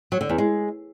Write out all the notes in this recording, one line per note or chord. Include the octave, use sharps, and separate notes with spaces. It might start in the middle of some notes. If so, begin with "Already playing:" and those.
F#3
D3
E2
G#3